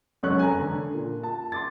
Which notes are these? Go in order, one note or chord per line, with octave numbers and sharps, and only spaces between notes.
F1 F#2 G#3 C#4 C#6 F#6
G#5 A#5
D3
A#2
A5
C6 D6 A6